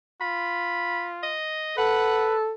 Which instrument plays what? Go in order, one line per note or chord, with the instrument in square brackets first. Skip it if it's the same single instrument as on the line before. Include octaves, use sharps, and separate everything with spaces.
[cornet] F4 [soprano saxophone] B5
[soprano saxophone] D#5
[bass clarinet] A4 [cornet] B4 [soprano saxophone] F#5